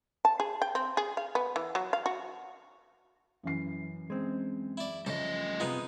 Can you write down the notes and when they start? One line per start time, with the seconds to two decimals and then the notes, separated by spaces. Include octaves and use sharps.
0.25 A5
0.40 G#4
0.62 G5
0.75 C4
0.97 G#4
1.17 F5
1.35 B3
1.56 E3
1.75 F#3
1.93 F5
2.06 F#4
3.43 F#2 E3 C7
4.10 G#3 C4
4.77 E4 D5
5.06 C#3 F3 G3 A3 A4 D#5
5.60 C3 G#3 B3 D#4 F4